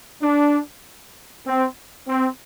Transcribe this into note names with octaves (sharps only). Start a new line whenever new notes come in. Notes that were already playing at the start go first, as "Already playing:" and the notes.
D4
C4
C4